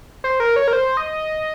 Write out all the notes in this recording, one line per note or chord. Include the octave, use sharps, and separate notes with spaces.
C5
A#4
C#5
A#4
C5
D#5